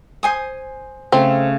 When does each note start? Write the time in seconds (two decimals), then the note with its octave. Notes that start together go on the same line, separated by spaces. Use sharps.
0.23 C5 G#5 D#6
1.12 C#3 A3 C4 C6